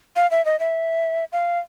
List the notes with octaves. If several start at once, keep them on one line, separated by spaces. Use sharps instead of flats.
F5
E5
D#5
E5
F5